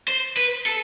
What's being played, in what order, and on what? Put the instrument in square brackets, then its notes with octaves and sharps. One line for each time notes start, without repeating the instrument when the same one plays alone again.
[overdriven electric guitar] C5
B4
A4